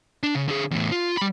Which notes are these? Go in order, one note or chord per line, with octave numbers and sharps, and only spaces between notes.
D4
C#3
D3 G#4
E2 A2
F4
G3 B5